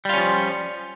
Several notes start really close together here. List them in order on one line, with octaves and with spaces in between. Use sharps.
G3 F4 C#4 F3